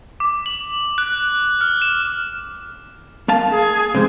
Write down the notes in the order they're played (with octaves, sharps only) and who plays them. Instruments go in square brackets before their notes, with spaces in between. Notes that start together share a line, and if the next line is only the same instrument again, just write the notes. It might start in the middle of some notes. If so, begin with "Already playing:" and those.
[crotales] D6
F#7
F#6
F6
E7
[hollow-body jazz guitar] A#3 F5 A5
[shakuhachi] G#4
[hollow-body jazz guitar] F2 G#2 C3 [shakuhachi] C5